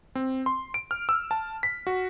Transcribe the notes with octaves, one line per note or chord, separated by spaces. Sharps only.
C4
C6
D7
F6
E6
A5
B6
F#4